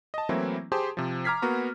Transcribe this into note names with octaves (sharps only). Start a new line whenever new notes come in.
D#5 A5
E3 F#3 A3 A#3 C4 E4
G4 G#4 C5 A5 C6 D6
C3 F3
A#5 D6 F6 G#6 B6 C7
A#3 B3 F#4 A#5